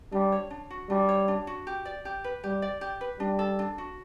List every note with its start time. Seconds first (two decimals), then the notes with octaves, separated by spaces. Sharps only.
0.12 G3 D4
0.32 C#5
0.50 D4
0.70 F#4
0.89 G3 D4
1.09 C#5
1.28 D4
1.47 F#4
1.67 G4
1.85 D5
2.05 G4
2.24 B4
2.43 G3 G4
2.62 D5
2.81 G4
3.01 B4
3.19 G3 D4
3.39 A4
3.59 D4
3.78 F#4